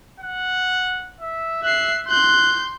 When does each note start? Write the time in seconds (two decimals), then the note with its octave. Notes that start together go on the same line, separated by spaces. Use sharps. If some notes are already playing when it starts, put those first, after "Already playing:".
0.20 F#5
1.21 E5
1.63 E5 F#6 C7
2.08 C6 F#6 G6